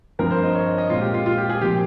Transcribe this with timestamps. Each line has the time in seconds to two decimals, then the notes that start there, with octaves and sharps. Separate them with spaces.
0.19 G2 F3 C4 A#4
0.31 C5
0.43 D#5
0.55 C#5
0.67 D#5
0.78 D#5
0.90 A#2 G#3 C4 F4
1.01 G4
1.14 F4
1.26 F4
1.37 G4
1.49 G#4
1.61 A#2 F3 C4 G4